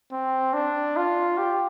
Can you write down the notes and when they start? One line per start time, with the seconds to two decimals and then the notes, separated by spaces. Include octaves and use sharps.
0.12 C4
0.54 D4
0.96 F4
1.38 G4